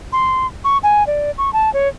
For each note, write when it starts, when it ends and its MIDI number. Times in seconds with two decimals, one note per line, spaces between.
0.13 0.46 84
0.64 0.78 85
0.83 1.06 80
1.07 1.31 74
1.38 1.52 85
1.53 1.72 81
1.74 1.88 73